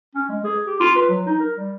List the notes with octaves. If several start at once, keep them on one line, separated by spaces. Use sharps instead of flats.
C#4
G#3
G#4
G4
F4
B4
F#3
D#4
A#4
G3